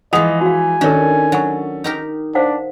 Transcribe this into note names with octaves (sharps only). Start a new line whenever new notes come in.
E3 F3 G#3 G#4 D#5 F#5 D#6 F7
F#4 F5 G#5
D#3 C#4 D4 G4 A4 A#4
F#3 D#5 F#5 C#6
D#4 G4 A#4
D4 C5 F5 F#5